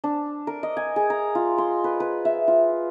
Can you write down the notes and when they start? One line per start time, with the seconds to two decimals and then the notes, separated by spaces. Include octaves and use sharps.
0.04 D4
0.47 A#4
0.63 D#5
0.77 G#5
0.96 G#4
1.10 A#5
1.35 F4
1.58 C6
1.84 B4
2.00 B4
2.25 E5
2.48 F4